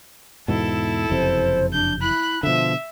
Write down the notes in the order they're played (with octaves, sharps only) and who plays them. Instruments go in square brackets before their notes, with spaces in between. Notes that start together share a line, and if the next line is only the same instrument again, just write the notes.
[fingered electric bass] E2 G#2 B2 [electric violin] E4 A4
[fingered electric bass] F#1 F2 C3 [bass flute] C5
[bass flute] D4 [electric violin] G6
[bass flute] E4 [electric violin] B5 F#6
[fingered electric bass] B2 D3 [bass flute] F3 [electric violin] E5